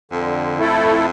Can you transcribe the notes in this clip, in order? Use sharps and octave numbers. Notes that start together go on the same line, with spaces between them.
F2 D3
A3 E4 A4